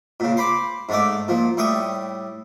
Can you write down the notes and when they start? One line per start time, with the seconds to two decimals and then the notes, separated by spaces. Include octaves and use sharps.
0.20 A#2 C#3
0.37 C5 B5 D6
0.89 G#2 A3 D5
1.28 A#2 F3
1.57 A2 G3 C#6 D#6